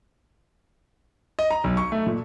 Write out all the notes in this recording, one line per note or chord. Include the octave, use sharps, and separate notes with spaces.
D#5
A#5
B1
C#6
A3
A#2